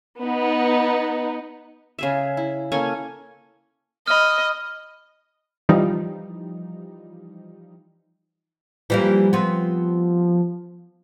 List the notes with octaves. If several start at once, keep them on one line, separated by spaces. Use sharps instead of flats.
B3 D#4
C#3 G#4 E5
E4
A#3 C#4 A4 G#5
D#5 B5 F6
E3 F3 G3 D#4
E3 F3 G3 A#3
B3 C4